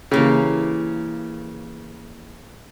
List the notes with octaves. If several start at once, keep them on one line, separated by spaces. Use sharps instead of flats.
C#3 E3 A#3 G4